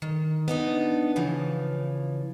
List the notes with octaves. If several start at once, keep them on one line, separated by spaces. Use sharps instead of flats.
D#3
B3 D4 D#4
C#3 E3 F3